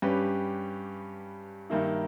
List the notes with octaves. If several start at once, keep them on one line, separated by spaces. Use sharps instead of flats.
G2 G3 C#4 G4 B4
G2 D#3 A#3 E4